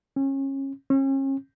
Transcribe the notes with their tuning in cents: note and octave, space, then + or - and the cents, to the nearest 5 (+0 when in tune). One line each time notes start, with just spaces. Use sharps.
C#4 -30
C#4 -40